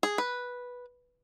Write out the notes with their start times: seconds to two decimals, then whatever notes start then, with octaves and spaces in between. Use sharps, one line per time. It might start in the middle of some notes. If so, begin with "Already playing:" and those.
0.03 G#4
0.18 B4